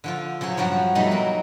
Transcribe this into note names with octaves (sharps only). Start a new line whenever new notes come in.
D3 F3 F4
C#3 F#3 C5 C#5
G2 F3 F#3 F#4
B2 F#3 G3 A3 D#4
F#3 A#3